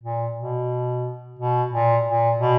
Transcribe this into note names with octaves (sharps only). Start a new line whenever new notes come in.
A#2
B2
B2
A#2
A#2
B2